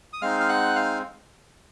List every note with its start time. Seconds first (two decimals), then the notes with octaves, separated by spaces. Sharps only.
0.13 D#6
0.22 G#3 C4 D#4 F5 F6
0.40 F6
0.49 F#5 F#6
0.76 F5 F6